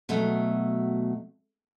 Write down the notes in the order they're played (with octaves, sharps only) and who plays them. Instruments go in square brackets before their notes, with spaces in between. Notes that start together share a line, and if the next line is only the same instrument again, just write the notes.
[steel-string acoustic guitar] B2 F#3 A3